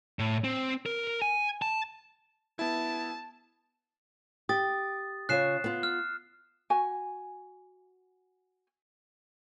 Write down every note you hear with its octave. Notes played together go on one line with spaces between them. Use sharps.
A2
C4
A#4
G#5
A5
B3 E4 A5
G4 D#6 A6
C#3 F4 C#5 F#6 C7 E7
B3 F4
F6
F#4 G#5